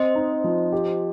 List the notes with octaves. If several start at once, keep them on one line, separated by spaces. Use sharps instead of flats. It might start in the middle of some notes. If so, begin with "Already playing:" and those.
Already playing: C4 C5 D#5
D#4
F3
G4